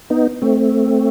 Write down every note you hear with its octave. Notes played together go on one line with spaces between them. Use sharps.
B3 D#4
A3 C4